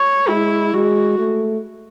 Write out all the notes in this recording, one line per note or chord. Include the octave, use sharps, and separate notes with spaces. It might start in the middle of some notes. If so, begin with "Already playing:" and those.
Already playing: C#5
G#3 E4
G#3 F#4
A3